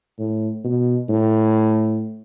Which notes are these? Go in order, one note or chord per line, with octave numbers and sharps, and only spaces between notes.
A2
B2
A2